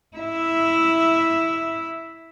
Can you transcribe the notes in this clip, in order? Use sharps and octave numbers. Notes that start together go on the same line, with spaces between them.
E4 E5